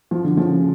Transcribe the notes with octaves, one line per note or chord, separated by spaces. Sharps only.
F3
D3
C#3 F3